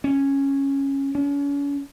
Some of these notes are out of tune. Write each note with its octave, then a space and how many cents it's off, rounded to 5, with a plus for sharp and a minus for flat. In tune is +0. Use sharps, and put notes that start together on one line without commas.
C#4 -10
C#4 +40